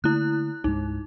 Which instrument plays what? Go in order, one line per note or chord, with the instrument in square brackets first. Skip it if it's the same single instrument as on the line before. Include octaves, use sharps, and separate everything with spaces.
[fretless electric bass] D3 A3 A#3 [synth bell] E4 F#6
[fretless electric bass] C2 G2 G#3 [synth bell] D#4